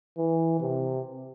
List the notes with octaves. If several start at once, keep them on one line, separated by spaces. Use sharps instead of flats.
E3
C3